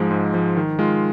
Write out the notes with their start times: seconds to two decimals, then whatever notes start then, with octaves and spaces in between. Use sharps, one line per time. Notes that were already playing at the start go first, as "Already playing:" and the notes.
Already playing: G#2 F3 G#3
0.11 G#2
0.34 F3 G#3
0.57 D#3
0.79 G#3 F4